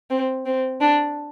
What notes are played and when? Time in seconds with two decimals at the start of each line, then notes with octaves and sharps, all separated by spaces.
0.10 C4
0.46 C4
0.81 D4